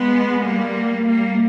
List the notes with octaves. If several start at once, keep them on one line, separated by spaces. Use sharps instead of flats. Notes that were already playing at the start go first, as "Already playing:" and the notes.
Already playing: G#3 B3
G3 A#3
G3 A#3